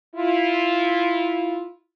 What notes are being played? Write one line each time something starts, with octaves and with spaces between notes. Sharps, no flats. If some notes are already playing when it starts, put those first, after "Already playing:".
E4 F4